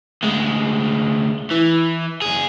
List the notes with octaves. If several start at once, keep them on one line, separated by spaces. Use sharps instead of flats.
D2 G#3
E3
F#2 G#4